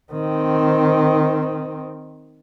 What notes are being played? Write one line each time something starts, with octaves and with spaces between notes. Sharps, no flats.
D#3 C4